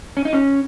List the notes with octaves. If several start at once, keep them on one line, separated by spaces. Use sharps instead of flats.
C#4
D#4
C#4